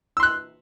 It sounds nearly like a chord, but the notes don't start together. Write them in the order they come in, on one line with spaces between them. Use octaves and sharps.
E6 C6 F#6